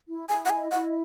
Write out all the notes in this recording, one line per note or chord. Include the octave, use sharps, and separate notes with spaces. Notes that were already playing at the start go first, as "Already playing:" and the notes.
E4
E4 G#5
F#5
D#5 G#5
E4 F#5